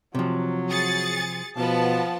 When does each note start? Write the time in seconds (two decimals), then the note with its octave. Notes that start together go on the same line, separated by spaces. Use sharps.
0.15 C3 F3 F#3
0.69 G#4 A6 C#7
1.57 B2 F3 B3 A5